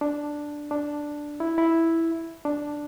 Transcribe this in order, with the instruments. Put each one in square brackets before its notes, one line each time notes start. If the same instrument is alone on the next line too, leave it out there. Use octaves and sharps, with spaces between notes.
[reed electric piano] D4
D4
E4
E4
D4